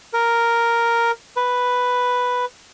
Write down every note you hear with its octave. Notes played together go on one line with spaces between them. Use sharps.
A#4
B4